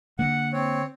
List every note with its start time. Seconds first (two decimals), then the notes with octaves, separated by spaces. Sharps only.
0.19 D3 A#3 F#5
0.53 C4 C#5